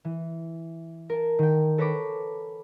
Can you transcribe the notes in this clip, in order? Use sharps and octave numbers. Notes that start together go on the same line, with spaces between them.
E3
A#4 A5
D#3 G5
A4 B4 C#5 A#5 B5 D6